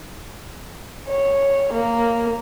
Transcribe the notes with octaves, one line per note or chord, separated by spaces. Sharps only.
C#5
A#3